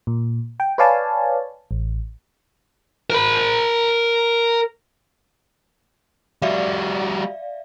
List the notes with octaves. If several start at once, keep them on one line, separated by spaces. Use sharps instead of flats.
A#2
G5
B4 C#5 D5 F5 G#5 A5
A1
A#4 B5
G3 F#4 D5 E5 F5